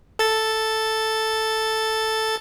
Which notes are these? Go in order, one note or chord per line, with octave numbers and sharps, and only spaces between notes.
A4 A6